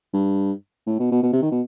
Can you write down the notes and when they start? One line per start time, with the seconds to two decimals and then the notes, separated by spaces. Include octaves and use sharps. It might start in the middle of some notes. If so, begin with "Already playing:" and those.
0.14 G2
0.87 A2
1.00 B2
1.12 B2
1.23 B2
1.33 C3
1.42 D#3
1.52 B2